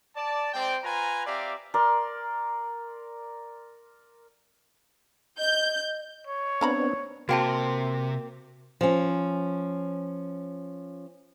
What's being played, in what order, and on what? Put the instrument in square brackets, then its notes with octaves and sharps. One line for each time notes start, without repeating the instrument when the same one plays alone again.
[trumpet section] D5 A5
G#3 C4 C5 D5 G5
F4 B4 G#5 A#5
C4 G4 D5 E5 F5 A#5
[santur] A#4 D5 C6
[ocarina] D#5 [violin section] G6
[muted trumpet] C#5
[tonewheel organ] B3 C4 D4 [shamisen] F5 A#5 B5
[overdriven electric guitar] C3 [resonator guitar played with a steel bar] A#3 C4 A#4 [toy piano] F#4 G5 A5
[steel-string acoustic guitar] F3 C#4